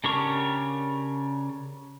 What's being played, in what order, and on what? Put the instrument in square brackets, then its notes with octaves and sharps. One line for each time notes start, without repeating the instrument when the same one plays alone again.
[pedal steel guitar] C#3 D4 G4 A#4 C#6